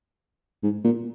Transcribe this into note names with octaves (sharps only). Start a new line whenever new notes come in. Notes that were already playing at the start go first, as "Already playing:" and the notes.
G#2
A#2